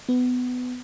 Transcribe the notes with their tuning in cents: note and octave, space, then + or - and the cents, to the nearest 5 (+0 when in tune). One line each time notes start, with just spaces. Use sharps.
B3 +20